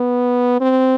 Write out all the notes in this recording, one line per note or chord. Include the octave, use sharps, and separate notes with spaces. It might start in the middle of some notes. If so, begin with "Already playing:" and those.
Already playing: B3
C4